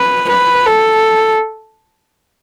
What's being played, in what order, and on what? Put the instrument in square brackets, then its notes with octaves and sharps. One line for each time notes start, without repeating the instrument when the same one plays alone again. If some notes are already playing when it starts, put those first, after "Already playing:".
Already playing: [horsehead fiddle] B4
B4
A4